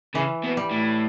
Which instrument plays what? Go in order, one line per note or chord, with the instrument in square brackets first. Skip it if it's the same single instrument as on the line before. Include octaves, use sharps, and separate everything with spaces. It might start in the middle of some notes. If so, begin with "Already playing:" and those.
[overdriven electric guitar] C#3 [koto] E3
[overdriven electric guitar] B2
[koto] G3
[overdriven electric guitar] A2